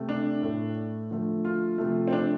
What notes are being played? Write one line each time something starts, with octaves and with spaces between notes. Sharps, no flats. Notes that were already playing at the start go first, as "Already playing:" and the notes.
Already playing: C3 A3
D4
A2 A3
D3 F3 A3
F4
C3 F3 A3
C4
D4